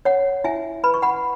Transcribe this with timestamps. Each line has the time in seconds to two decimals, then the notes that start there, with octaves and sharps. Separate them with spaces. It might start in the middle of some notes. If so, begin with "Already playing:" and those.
0.05 C#5 F#5
0.44 E4 E5 G#5
0.84 B4 B5
0.94 C#6
1.02 F#5 B5